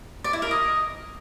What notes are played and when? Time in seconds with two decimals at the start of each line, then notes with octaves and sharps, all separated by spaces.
0.24 D5
0.33 E4
0.42 A#4
0.51 D#5